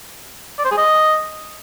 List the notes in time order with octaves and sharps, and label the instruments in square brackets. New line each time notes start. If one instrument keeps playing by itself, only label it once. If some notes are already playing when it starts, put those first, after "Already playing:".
[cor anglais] D5
C5
G#4
D#5